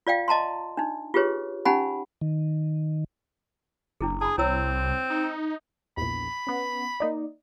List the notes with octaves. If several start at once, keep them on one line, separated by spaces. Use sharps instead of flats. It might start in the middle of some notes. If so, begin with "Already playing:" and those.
F4 D5 F5 G5
D#5 A5 A#5 C6
D4 D#4
F4 G4 G#4 B4 C#5
C#4 D#4 G4 F#5 G#5 B5
D#3
F#1 D4 E4 G#4
G#4 A5 B5
C2 C4 E4 C#5 E6
D#4
A#1 E2 B5
B3 C#4
A#3 D#4 D5